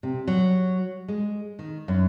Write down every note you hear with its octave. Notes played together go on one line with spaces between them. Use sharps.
C3
F#3
G#3
D#3
F#2